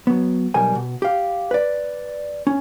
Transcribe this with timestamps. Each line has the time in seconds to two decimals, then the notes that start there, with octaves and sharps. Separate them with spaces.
0.07 F#3 B3
0.54 B1 G3 A#4 G#5
0.75 B2
1.02 G4 F5
1.51 B4 D5
2.47 C#4